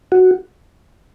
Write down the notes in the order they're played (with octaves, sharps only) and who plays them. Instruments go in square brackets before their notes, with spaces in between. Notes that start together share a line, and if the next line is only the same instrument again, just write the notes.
[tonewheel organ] F#4